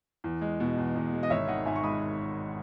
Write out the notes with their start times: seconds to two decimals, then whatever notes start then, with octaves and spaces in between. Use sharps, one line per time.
0.24 E2
0.41 G#3
0.60 B2
0.78 E2
0.95 E2
1.13 G#3
1.23 D#5
1.30 G#1 C#5 E5
1.48 D#3 D#5 F#5
1.65 G#2 E5 G#5
1.76 C#6
1.83 G#3 B5 D#6